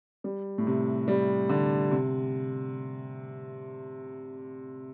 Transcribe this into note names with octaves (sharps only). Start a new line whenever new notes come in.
G3
A2
C3
G3
D3
C3